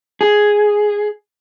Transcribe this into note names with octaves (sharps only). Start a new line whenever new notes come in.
G#4